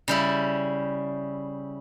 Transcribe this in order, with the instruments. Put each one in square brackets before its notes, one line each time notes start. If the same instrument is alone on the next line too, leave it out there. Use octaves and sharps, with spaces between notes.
[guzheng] C#3 G3 E4